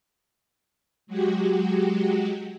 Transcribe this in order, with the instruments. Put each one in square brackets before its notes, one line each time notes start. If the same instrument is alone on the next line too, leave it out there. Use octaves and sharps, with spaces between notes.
[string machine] F#3 G#3 F#4 G4